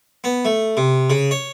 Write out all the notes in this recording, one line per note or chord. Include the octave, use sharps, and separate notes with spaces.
B3
A3
C3
C#3
C#5